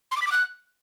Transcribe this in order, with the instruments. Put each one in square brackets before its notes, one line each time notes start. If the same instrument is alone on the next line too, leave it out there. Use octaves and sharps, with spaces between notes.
[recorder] C6
D6
B6
D6
F#6